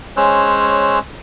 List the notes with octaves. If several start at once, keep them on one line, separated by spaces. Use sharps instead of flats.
G#3 C#4 C5 C#5 E6 F#6